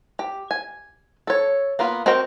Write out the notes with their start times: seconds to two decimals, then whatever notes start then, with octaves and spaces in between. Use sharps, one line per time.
0.19 G4
0.51 G#5
1.27 A4 C#5
1.79 A#3 B3 F4 B4
2.06 C4 F#4 A#4 D#5 G5